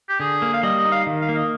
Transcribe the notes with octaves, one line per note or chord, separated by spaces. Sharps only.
G4
D3 G#4
A#3
F5
G3 D#5
D#5
D#4
F5
D#3
F5
A#3
D#5